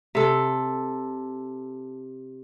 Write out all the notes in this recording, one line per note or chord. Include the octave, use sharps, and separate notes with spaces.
C3 A4